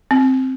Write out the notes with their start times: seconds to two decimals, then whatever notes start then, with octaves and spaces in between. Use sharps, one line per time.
0.11 C4